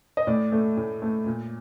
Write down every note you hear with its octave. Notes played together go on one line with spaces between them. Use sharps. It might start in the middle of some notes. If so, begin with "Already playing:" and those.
D#5
A2 D5
A3
A2
A3
A#2